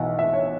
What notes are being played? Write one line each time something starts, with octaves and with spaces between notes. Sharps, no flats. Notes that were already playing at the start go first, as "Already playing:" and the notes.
Already playing: B1 E3 F#5
E5
C#5